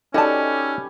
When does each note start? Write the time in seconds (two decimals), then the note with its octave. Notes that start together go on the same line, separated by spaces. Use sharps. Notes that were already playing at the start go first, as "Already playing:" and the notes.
0.14 C#4 D#4 F#4 G4 A4 B4 D5 A5